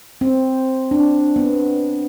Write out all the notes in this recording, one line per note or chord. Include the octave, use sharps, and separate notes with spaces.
C4
D4
B3